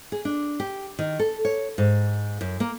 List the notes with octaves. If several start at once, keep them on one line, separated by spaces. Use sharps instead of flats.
G#4
D4
G4
D#3
A4
C#5
G#2
F#2
A#3